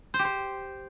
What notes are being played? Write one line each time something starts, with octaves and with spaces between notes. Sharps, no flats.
C5
G4
C5